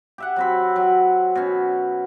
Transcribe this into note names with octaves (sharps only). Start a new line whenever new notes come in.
G4 E5 F#5
F#3 C4 B5
F#3
B2 C#4